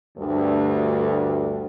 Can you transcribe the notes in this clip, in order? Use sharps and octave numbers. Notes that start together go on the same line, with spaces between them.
D2 G2